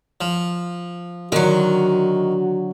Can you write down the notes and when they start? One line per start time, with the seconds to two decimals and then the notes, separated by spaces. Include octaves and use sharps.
0.21 F3
1.32 D3 D#3 F#3 F#4